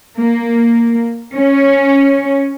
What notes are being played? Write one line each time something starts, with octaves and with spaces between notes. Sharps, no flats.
A#3
C#4